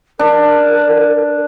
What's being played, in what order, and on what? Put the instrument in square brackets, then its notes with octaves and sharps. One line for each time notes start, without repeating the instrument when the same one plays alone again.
[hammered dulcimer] D4 [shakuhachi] A#4